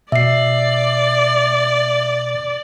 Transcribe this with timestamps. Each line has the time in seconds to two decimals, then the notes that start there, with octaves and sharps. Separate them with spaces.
0.12 B2 D5 E5 C7